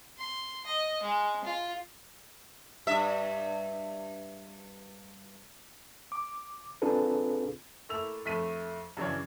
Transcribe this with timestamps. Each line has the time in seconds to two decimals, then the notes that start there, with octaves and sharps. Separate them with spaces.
0.19 C6
0.66 D#5
1.03 G#3
1.45 F4
2.87 G2 E5
6.12 D6
6.82 C4 D4 F4 G#4 A4 B4
7.89 A3 A#3 E4 E6 F7
8.25 F2 A3 B6 D#7
8.97 F#2 C#3 E3 D4 C#5